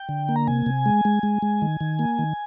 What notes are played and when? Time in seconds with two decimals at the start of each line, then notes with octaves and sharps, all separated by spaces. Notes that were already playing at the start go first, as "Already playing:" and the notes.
Already playing: G5
0.09 D3
0.29 A#3
0.36 A#5
0.47 C3 G#5
0.66 C3
0.86 G#3
1.05 G#3
1.23 G#3
1.42 G#3
1.62 D#3
1.81 D#3
1.99 A#3
2.19 D#3